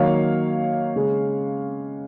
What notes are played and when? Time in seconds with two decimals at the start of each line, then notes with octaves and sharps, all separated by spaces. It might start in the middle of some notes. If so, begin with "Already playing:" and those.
Already playing: D#3 F#3 A#3 C#5 F5
0.96 C#3 G#3